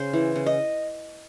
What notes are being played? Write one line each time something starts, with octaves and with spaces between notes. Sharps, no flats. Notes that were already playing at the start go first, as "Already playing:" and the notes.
Already playing: C#3 C5
E3
C#3
D#5